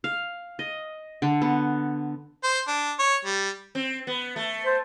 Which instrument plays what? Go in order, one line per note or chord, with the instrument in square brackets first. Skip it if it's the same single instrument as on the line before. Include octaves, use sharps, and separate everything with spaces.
[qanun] F5
D#5
D3
B3
[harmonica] C5
D4
C#5
G3
[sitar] C4
B3
A3
[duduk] C5